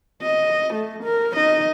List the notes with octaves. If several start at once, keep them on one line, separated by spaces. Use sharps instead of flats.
D#5
A3
A#4
D#4 D#5